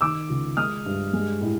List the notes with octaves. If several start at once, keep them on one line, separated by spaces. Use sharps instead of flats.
D#3 D6 E6
C#2
G#3 D#6 F6
G2
G#3
A2